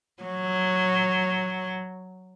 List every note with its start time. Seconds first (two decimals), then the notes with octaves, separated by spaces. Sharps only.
0.23 F#3